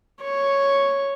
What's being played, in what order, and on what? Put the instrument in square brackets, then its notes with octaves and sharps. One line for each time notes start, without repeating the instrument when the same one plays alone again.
[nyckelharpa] C#5